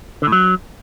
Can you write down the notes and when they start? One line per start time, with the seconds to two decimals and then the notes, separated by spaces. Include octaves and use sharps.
0.22 D3
0.27 A2
0.32 F#3